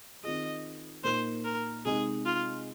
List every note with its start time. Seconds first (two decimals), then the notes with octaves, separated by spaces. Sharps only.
0.23 D#3 C4 F4 G#4 D#5
1.04 A#2 A#3 D#4 C5
1.45 A#4
1.85 C3 G#3 D#4 G#4
2.26 F4